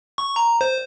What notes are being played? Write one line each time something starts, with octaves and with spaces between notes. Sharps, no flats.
C#6
A#5
C5